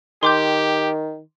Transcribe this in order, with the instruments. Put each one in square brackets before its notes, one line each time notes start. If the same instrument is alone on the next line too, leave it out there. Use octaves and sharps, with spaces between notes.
[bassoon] D#3 [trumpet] G4 [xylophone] C6 D6 G6